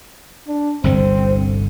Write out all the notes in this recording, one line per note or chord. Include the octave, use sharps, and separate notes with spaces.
D4
G1 C2 D3 C4